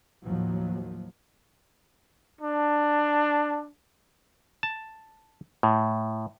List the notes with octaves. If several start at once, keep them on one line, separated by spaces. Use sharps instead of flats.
D#2 A2 F3 F#3
D4
A5
A2